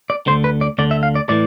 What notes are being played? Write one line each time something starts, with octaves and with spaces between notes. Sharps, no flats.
D5
D2 D3 C5
B4
D5
D2 D3 D5
E5
F5
D5
A2 E3 D5